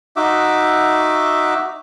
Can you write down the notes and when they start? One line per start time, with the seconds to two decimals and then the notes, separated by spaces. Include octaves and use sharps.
0.16 D#4 F#4 E5 D6